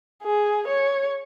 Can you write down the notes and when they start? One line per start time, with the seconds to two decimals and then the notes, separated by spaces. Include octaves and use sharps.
0.23 G#4
0.67 C#5